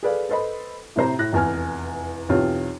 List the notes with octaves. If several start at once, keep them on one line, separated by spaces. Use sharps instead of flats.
G#4 A4 B4 D5 F5
A4 B4 C5 D#5 B5
A2 C3 C5 A#5
A2 F#6 A#6
F1 E2 G#5 F6
B1 E2 C4 F4 G4 C#5